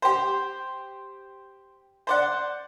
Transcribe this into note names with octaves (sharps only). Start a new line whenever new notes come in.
G4 C5
C5 D5 F#5